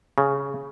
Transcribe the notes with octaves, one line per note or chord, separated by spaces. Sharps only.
C#3